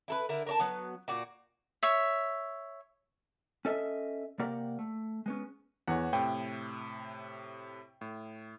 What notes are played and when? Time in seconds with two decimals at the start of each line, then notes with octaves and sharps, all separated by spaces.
0.08 E4 A4 B4
0.29 D3 E4 A#4
0.46 A#4 C#5 A5
0.59 F#3 B3
1.08 A#2 F#4 D5
1.83 C#5 E5
3.65 C#4 A4 D#5 E5
4.39 C3 A#3 G4 A#4 D5 F#5
4.79 A3
5.26 G#3 B3 C#4
5.88 E2 C#5 F#5
6.13 A2 C3 G5
8.01 A2